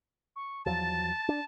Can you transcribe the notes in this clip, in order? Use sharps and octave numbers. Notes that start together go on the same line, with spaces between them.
C#6
E2 F3 F#3 A5 A6
D4